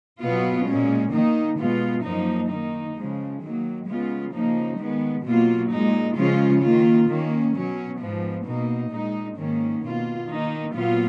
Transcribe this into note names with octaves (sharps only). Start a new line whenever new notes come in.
B2 F#3 B3 F4
A#2 G#3 C#4
D#3 A#3 D#4
B2 G#3 B3 F4
F#2 F3 A#3 D#4
D#3 A#3 D#4
C#3 F3 G#3
D#3 F#3 A#3
C#3 G#3 B3 F4
C#3 F3 A#3 D#4
D#3 G#3 B3
B2 F#3 A#3 F4
A#2 G#3 D#4
C#3 F3 G#3 C#4 F4
D#3 A#3 F4
D#3 A#3 C#4
B2 F#3 C#4
G#2 F3 B3
B2 A#3 D#4
A#2 G#3 D#4
G#2 D#3 A#3 C#4
B2 A#3 F4
D#3 A#3 D#4
A#2 F#3 B3 F4